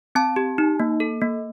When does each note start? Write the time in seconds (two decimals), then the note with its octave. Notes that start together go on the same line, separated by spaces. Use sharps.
0.15 C4 A5
0.36 G4
0.58 D#4
0.80 A#3
1.00 A4
1.21 A#3